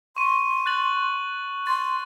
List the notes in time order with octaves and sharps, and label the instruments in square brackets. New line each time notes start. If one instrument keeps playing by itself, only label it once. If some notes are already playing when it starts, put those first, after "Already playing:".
[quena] C6 [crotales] C#6 D#7
[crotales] F#6 A6 F#7
[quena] C6 [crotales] A6